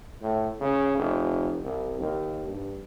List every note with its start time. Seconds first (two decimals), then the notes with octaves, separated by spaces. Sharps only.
0.22 A2
0.61 C#3
0.97 F1
1.63 C2
1.99 D#2
2.47 G2